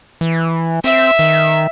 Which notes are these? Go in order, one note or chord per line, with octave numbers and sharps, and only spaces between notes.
E3
C4 E5
D#3